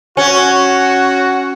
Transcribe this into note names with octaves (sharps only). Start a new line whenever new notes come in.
C#4 F#4